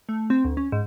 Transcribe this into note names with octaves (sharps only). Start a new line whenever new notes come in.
A3
C4
D2
C#4
G#2